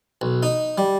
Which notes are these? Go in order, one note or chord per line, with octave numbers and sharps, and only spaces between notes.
B1
D#4
G3